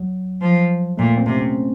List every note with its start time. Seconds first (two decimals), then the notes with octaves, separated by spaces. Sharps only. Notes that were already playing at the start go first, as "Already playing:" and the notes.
Already playing: F#3
0.41 F3
0.97 A#2 A3
1.17 C4
1.26 C3
1.36 C#4